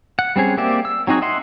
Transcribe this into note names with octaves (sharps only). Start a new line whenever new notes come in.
F#5
G3 C4 C#4 G#4
A#3 C4 G4 D5 E5
E6
F#3 C4 D#4 F#4 G#4
D#5 E5 F#5 C6